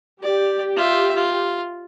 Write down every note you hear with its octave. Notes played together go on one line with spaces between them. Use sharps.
G4 D5
F4 E5
F4